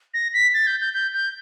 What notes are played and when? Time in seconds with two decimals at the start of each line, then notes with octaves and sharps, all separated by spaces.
0.14 A#6
0.34 B6
0.54 A6
0.67 G6
0.81 G6
0.94 G6
1.14 G6